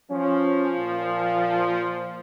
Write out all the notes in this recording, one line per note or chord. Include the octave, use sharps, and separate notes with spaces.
F3 C#4
A#2